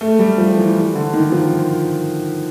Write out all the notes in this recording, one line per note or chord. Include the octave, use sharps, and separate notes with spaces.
A3
G3
F3
E3
D3
D#3
F3